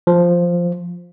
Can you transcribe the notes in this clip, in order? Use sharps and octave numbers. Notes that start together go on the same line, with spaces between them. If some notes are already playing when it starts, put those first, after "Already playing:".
F3